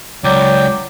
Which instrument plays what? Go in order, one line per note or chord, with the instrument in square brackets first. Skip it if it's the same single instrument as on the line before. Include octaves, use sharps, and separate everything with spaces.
[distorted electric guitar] C#2 [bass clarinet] F#3 [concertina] D5 G5